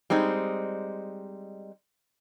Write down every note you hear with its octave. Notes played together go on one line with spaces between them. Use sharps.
G3 G#3 C4 D#4